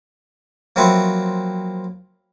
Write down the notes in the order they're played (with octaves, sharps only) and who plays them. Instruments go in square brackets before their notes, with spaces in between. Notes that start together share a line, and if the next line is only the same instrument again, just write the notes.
[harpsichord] F3 F#3 A#3 C4 B4 E5